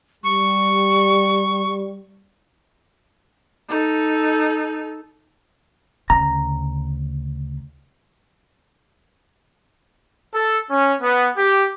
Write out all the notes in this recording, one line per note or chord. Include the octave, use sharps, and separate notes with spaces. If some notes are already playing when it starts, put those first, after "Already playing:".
G3 C#6
D#4 A4
D2 C#3 A#5
A4
C#4
B3
G4